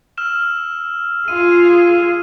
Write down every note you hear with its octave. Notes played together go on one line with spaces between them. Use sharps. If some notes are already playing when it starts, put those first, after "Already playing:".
E6 F6 E7
F4 G#4 D#7